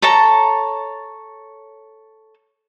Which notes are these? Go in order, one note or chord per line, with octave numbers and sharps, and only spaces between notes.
A4 C#5 A5 A#5